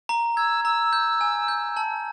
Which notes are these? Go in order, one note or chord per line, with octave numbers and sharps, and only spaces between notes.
A#5
E6 G#6
A#5 E6
G6
G#5
G6
A5